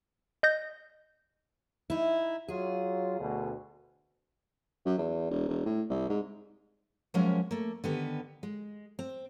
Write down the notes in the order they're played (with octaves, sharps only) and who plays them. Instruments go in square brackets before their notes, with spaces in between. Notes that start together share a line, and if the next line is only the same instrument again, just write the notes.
[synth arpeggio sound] D#5 G6 A#6
[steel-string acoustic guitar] D#4 E4
[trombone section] F#3 F4 [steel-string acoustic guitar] G#4
[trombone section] D2 B2
[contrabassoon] F#2
E2
E1
E1
A2
C2
G#2
[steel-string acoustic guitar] F3 F#3 G#3 A#3 C#4 E5
A3 A#3
D3 D#3 B3 G4 B4
G#3
C4